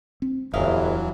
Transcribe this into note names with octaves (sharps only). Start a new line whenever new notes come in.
C4
D1 G1 E2 E3 F#3 E4 D#5 F5